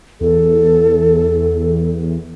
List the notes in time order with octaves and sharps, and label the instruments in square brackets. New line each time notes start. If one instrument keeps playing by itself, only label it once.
[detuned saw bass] E2 [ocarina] A4